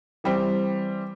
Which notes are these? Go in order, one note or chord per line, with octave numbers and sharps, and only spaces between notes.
E3 G3 C4